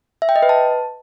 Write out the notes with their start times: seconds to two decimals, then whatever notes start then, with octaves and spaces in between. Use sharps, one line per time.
0.22 E5
0.29 G5
0.36 D#5
0.42 B4
0.49 A5